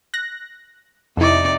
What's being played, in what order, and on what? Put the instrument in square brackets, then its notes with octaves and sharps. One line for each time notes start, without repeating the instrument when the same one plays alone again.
[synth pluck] F#6 A#6
[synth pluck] F2 E4 [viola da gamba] C3 D#4 D5